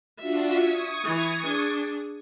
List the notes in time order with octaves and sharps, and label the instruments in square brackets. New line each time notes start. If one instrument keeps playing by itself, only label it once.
[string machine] D4 F4 F#4 [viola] E5
[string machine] C#6 D#6 G#6
[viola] E3 E4
D4 G#4